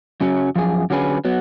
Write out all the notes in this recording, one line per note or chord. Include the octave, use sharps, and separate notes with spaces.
F#2 C#3 F#3 C#4
F#2 F3 G#4
D3 F#3 C#4 G#4 B4
F#3 B3